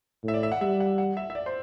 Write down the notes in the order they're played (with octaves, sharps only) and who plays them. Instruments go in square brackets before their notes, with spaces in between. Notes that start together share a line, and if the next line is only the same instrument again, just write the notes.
[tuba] A2 [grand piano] E5
[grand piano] D5
E5
F#5
[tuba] G3 [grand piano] E5
[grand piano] F#5
F#5
E5
E5
D5
C5